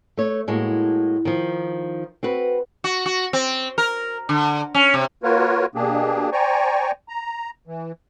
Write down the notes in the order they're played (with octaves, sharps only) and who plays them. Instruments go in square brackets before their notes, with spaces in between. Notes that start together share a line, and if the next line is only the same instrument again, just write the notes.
[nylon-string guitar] A3 C#5
A2 G#3 A#3 F#4
D#3 F3
C4 F#4 B4
[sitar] F#4
F#4
C4
A#4
D3
C#4
C3
[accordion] A#3 F4 F#4 A#4 B4 C#5
B2 A#3 D4 G4 G#4
C5 D5 G5 G#5 A#5 C#6
A#5
E3